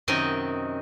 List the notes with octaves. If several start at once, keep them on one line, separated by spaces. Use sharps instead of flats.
F#2 C3 D#3 D#4 A#4 D#5